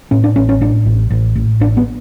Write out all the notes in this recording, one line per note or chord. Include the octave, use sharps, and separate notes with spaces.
A2 C#4
D4
A1 C#4
C#4
A2 D4
A1
A1
A2
A1 D4
B3